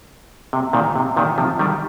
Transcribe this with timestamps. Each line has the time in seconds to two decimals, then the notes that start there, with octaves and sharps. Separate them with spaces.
0.53 C3
0.73 A#2 D#3
0.96 C3
1.16 A#2 D#3
1.38 C3 F3
1.59 D#3 G3